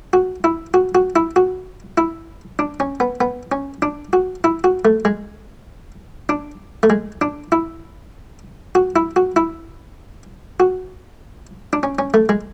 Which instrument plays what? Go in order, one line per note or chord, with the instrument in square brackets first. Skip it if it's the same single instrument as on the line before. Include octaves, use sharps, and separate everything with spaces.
[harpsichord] F#4
E4
F#4
F#4
E4
F#4
E4
D4
C#4
B3
B3
C#4
D4
F#4
E4
F#4
A3
G#3
D4
A3
G#3
D4
E4
F#4
E4
F#4
E4
F#4
D4
C#4
C#4
A3
G#3